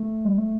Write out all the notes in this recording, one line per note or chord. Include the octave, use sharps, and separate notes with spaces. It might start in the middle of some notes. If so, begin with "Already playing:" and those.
Already playing: A3
G3
A3